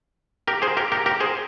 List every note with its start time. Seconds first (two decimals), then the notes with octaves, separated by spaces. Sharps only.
0.48 G4 A#4
0.62 G#4 C5
0.77 G4 A#4
0.92 G4 A#4
1.06 G4 A#4
1.20 G#4 C5